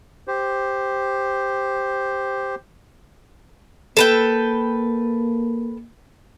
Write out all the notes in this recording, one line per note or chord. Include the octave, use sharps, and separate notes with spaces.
G4 C5
A#3 A4 B4 G5